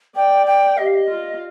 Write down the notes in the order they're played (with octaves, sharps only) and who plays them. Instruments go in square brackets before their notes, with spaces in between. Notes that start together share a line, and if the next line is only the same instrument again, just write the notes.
[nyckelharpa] D5 [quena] G5
[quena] G5
[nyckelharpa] G4 [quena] D#5
[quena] F5
D#5
[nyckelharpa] F4